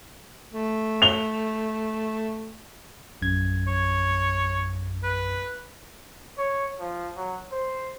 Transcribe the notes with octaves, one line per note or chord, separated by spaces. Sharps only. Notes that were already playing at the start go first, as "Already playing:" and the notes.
A3
F7 G7
A#1 F#2 G#6
C#5
B4
C#5
F3
F#3
C5